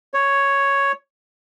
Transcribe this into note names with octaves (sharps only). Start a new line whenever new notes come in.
C#5